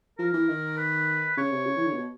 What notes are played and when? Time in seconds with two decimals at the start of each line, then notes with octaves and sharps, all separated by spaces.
0.18 F3 A#4
0.34 E3
0.49 D#3
0.77 B4
1.37 C#3 C#5
1.51 C3
1.66 C#3
1.77 E3
1.86 D3
1.93 A#2
1.96 B2